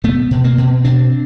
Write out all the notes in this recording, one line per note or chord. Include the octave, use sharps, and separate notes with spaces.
B2 A3 B3
B2
A#3 C4
B2
B2 C4 D4